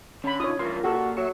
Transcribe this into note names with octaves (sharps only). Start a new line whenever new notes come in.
D3 C#4 B5
D#4 F4 C#5 D#6
G2 E3 A3 F4 A#4 C6
A#2 F#4 G4 A4 E6
F#3 E5 C#6